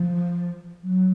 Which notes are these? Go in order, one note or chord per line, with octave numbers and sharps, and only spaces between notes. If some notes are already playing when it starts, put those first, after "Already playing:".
Already playing: F3
F#3